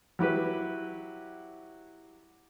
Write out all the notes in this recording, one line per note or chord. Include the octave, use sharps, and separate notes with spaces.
F#3 E4 G4 B4